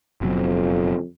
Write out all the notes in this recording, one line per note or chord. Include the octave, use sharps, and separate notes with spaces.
F#1 F2 B2 F#3